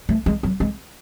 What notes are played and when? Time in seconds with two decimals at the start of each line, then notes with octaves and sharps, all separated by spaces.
0.09 A3
0.26 G#3
0.43 F#3
0.60 G#3